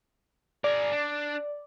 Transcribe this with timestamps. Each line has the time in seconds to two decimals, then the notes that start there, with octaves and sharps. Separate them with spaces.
0.64 G#4 A#4 D5
0.91 D4